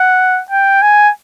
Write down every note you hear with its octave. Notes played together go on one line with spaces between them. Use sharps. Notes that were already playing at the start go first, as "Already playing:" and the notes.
Already playing: F#5
G5
G#5